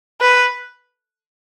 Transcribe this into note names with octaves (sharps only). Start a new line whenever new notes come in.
B4